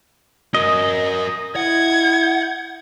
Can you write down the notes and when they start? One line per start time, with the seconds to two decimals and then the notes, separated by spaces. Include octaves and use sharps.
0.54 F#4 A#4 D#5
1.56 E4 F#5 G#6